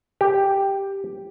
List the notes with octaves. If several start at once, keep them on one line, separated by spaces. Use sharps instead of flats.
G4